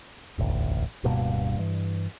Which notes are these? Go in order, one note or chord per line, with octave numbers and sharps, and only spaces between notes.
E1 A1 D2
D1 G2 B2 A#3
G2 E3